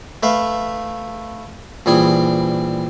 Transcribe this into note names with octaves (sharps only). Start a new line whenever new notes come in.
A3 B4 E5 F5
A#1 E3 G3 G#4